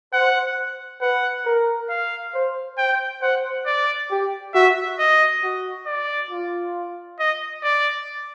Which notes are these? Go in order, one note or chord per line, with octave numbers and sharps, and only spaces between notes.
C5 F#5
B4 F#5
A#4
F5
C5
C5 G5
C5 F#5
D5
G4
F#4 E5
D#5
F#4
D5
F4
D#5
D5